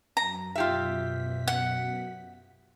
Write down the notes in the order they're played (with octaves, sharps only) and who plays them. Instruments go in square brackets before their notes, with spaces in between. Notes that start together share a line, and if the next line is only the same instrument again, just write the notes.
[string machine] F#2 [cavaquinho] A#5
[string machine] F#2 B2 B6 [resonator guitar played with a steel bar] F4 G4 E5
[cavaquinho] F#5